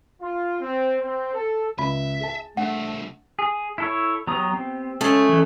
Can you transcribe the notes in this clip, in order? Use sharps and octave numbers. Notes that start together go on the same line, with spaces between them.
F4
C4
C4
A4
C#2 E5 B5
G#4 A5
C2 A3 D4 F#5
G#4
E4 A4 C#5
F#3 B3 G4 A#5 D#6
C4
G#3 A3 C#4 G#4 C#5 A5
E3 C#4